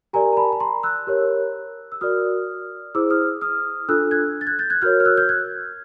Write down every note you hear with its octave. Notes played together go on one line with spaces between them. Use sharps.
G4 A#4 D5 G#5 A#5
A#5
A5 B5
B5
A#5 C6
E6 F#6
G4 A#4 C#5
E6
F#4 A#4 D5 D#6 F6
E4 G#4 C5 D6 E6
D#6 F6
D#6 F6
D4 F4 A4 E6 F#6
F#6 G#6
A6
F#6 G#6
G6 A6
F#6 G#6
F#4 A#4 C#5 F6 G6
F6
E6 F#6
F6 G6
F#6 G#6